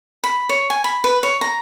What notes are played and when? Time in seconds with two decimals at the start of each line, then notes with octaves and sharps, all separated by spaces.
0.24 B5
0.49 C#5
0.70 G#5
0.84 B5
1.04 B4
1.23 C#5
1.41 A#5